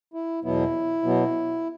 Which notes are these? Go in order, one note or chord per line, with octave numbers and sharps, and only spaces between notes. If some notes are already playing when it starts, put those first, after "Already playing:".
E4
E2 B2 F#3 B3 E4
B2 F#3 B3